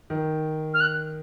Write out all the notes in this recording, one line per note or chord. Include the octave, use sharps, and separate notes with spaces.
D#3
F6
F#6